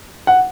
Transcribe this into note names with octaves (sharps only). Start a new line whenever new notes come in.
F#5